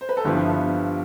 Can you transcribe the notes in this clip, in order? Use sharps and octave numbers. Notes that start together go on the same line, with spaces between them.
C5
B4
A4
G1 G2 F3 B3 E4 G4